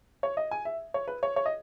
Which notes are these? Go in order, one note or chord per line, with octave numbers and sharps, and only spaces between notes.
C#5
D#5
G#5
E5
C#5
B4
C#5
C#5
D#5